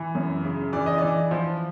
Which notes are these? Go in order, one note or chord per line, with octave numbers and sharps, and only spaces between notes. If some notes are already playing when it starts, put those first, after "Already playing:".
Already playing: E3
F#2
C#3
E3 D5
D#5
E3 D5
F3